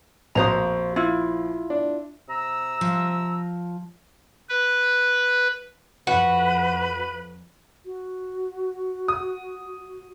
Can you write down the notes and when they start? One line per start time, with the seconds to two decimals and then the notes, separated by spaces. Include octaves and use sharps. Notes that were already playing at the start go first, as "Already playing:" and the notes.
0.35 A#1 F2 F#4 C5 A#5 D#6
0.96 E4 F4
1.70 D4
2.28 C3 A#5 E6
2.81 F3
4.49 B4
6.07 F2 F#4 B4
7.86 F#4
9.08 D#6